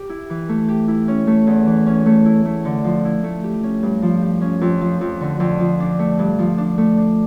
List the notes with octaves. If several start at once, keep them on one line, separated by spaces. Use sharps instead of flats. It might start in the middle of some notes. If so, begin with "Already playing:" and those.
Already playing: G4
E4
E3
A3
G4
E4
C#4
A3
E2
E3
C#4
A3
E4
A3
D3
F3
E4
A3
G4
C#4
G2
F3
G4
C#4
F2
F3
F2
D3
F2
F3
D4
A3
G2
F3
D4
A3
D4